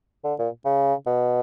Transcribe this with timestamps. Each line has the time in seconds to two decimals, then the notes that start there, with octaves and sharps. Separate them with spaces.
0.24 D3
0.39 A#2
0.65 C#3
1.07 B2